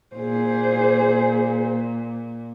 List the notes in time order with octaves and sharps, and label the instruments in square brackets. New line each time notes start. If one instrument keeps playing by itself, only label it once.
[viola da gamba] A#2 [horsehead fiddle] G#4 C5